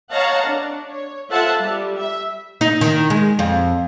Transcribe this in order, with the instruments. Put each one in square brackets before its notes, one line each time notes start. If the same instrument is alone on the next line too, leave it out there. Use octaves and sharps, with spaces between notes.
[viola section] C#5 D#5 F5 F#5 A5 A#5
D4
C#5
F4 A4 C5 E5 F#5 A5
G3
E5
[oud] D#4
D#3
G#3
F2